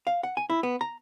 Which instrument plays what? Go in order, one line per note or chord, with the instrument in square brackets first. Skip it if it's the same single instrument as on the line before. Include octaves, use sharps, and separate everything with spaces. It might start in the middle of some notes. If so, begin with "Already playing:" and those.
[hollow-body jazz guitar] F5
F#5
G#5
E4
B3
A#5